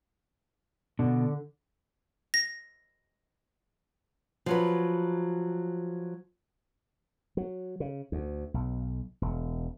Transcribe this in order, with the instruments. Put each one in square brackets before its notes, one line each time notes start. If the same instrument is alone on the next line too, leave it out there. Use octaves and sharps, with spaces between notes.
[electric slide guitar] B2 [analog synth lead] D3
[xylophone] A#6
[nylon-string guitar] F3 F#3 B4
[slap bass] F#3
C#3
D2
B1
E1